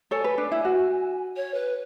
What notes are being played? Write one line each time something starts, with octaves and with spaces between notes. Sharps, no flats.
A4 C#5 G#5
B4
D4
E4
F#4
C#5
B4